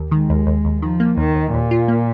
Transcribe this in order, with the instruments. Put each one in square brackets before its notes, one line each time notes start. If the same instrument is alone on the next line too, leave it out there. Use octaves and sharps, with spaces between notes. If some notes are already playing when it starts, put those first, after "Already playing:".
Already playing: [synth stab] D#2
[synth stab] D#3 [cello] G#3
[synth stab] D#2
D#2
D#2
[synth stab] D#3 [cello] F3
[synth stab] A#3
[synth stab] D#2 [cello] D#3
[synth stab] D#2
[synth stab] D#2 [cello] A#2
[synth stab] F4
A#3